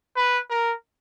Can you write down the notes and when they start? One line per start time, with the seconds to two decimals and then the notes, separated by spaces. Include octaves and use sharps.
0.16 B4
0.50 A#4